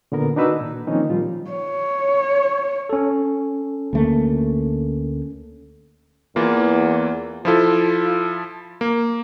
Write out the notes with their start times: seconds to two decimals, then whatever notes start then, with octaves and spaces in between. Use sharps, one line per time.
0.12 A#2 D3 B3 A#4
0.36 D#3 D4 D#4 F#4 B4 E6
0.60 A#2
0.87 D#3 F3 A#3 C4 C#4 D#4
1.10 A#2 F3 G3 F4
1.51 C#5
2.89 C#4 A4
3.93 D2 A3 A#3
6.36 E2 E3 A#3 F4
7.45 F3 E4 F4 A4
8.81 A#3